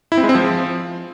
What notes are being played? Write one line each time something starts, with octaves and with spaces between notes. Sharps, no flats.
E4
C4
G#3
C4
F3